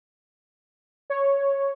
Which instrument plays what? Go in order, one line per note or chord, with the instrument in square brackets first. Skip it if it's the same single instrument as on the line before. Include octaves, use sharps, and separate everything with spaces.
[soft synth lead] C#5